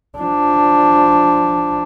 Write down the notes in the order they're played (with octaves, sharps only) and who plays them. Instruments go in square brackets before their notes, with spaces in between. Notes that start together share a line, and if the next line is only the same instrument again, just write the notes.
[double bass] F3 D4